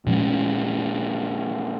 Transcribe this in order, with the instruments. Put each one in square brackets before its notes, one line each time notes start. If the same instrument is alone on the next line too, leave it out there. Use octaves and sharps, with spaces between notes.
[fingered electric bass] A#2 F3 G#3 C#4